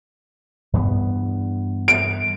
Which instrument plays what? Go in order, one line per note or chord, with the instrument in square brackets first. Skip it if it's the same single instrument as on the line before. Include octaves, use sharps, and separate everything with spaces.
[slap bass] G2 E3 B3
[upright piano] D7